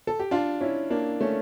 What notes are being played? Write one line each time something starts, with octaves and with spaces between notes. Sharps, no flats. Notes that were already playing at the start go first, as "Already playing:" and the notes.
A4
G4
D4 F4
C#4 E4
A#3 D4
A3 C#4